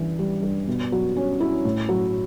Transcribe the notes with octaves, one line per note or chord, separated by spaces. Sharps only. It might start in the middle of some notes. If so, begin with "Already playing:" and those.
Already playing: G2 E3
G3
G2
B2
F#3
C#4
E4
A2
F#3